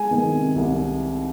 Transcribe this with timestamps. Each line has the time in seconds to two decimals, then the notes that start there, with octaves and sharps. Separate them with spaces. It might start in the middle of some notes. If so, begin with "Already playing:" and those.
Already playing: G#3 G#5
0.11 D#3
0.33 C3
0.56 C2